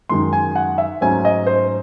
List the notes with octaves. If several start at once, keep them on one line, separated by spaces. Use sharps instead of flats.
F#2 D#3 G#3 C6
G#5
F#5
E5
G#2 F#3 A3 C#4 G#5
D#5
C5